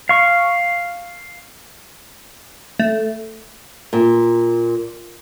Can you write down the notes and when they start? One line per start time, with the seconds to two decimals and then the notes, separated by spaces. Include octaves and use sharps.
0.09 F5 C#6
2.79 A3
3.93 A#2